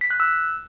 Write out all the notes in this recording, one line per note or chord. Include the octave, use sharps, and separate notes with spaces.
B6
F#6
E6